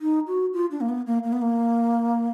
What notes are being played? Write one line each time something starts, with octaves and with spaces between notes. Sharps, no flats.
D#4
F#4
F4
D4
A#3
B3
A#3
A#3
B3
A#3